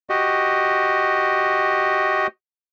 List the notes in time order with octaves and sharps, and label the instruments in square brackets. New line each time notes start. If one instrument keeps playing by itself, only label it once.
[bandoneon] F#4 G4 D#5